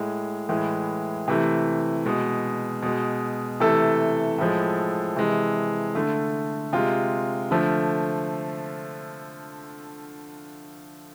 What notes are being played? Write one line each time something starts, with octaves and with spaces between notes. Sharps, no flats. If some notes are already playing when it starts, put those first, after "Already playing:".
Already playing: A2 G#3
A2 E3 G#3
C3 E3 A3
B2 G#3
B2 G#3
C3 E3 A3 A4
A2 F3 G#3
C3 E3 G#3
D3 A3
C3 G#3 F4
D3 F3 A3